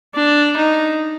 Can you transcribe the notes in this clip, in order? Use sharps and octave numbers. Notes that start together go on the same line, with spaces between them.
D4
D#4